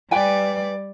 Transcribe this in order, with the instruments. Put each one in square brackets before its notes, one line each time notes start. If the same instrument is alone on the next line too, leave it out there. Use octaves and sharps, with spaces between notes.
[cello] G3 D5 [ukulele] B4 G5 G#5